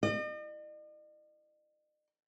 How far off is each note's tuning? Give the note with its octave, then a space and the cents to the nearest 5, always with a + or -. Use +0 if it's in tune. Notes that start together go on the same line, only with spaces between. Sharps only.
D#5 -45